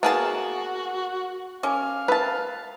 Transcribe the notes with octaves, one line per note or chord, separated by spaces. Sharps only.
A#3 B3 F#4 G#4 A5
C#4 A#4 F5 G#5 D6
A#4 B4 A5